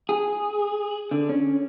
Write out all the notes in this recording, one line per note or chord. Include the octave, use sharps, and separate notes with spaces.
G#4
D3
C#4